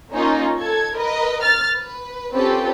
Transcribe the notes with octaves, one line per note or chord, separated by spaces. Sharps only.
A#3 C#4 D#4 F4
A4 G#6
A#4 B4 D#5
F6 A6
B4
C4 C#4 F4 G4 A4 B4